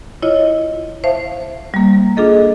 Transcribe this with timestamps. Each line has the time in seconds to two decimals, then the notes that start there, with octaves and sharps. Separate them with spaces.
0.22 E4 F4 C#5 D#5
1.04 C5 E5 F5 A5
1.74 G3 A#3
2.17 D4 F4 G#4 A4 D#5